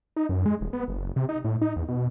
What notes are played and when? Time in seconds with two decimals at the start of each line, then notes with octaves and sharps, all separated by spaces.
0.16 D#4
0.29 F#2
0.46 G#3
0.61 D#1
0.73 B3
0.88 F#1
1.16 C3
1.29 D#4
1.45 A2
1.62 D#4
1.76 E2
1.88 B2